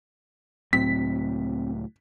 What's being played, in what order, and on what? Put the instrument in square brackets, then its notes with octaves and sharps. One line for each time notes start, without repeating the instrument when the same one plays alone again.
[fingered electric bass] C#2 A2 F#3 [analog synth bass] C4 [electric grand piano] B6